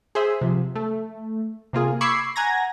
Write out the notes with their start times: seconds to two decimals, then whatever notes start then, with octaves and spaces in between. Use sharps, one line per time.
0.15 G#4 C5 E5
0.41 C3 F3
0.76 A3
1.73 C3 A#3 F4 G#4
2.01 B5 C#6 D6 E6 G#6 C7
2.36 F#5 G#5 A#5 G#6 A#6